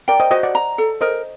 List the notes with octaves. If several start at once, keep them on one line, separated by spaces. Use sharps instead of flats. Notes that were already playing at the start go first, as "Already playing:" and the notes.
A#4 D5 G5
C5 D#5
F#4 C5 D#5
D5 F#5
A#5
A4
A#4 C5 D#5